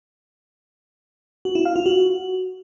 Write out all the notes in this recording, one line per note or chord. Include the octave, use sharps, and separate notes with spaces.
F#4
E4
F5
F4
F#4